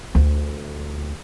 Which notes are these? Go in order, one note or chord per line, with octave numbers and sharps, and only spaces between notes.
D2